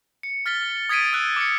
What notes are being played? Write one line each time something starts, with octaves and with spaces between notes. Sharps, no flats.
C#7
F6 A6 B6 G7
D#6 G#6 A6 B6 D7 D#7
E6 F#6
D6 C#7